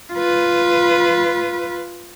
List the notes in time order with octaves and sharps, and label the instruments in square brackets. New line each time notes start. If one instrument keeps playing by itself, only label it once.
[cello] F4 B4